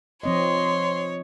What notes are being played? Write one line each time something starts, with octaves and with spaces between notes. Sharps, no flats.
F3 C4 C#5 D#5 C6